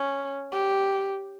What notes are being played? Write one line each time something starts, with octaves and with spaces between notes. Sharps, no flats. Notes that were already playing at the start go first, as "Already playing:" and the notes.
Already playing: C#4
G4